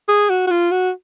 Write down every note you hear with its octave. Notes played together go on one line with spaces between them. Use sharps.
G#4
F#4
F#4
F4
F#4